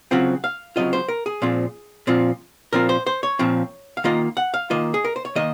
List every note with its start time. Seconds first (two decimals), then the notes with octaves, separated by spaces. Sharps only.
0.11 C#3 F#3 C4 F4 F#5
0.44 F5
0.76 C#3 F#3 C4 F4 D#5
0.93 C5
1.08 A#4
1.26 G#4
1.42 A#2 F3 C4 F4
2.07 A#2 F3 C4 F4
2.73 A#2 F3 C4 F4 A#4
2.89 C5
3.07 C5
3.23 C#5
3.39 A#2 F3 C4 F4
3.97 F5
4.04 D#3 A#3 F4 D#5
4.37 F#5
4.54 F5
4.70 D#3 A#3 F4 D#5
4.94 G#4
5.05 A#4
5.16 C5
5.25 C#5
5.35 D#3 A#3 D#5